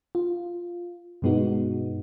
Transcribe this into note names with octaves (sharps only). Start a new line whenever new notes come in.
F4
G2 B2 G#3 B3 D#4 F#4